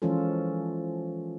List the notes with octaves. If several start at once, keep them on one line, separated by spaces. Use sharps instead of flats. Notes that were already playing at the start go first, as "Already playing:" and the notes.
E3 F3 G#3 C#4 F4 A4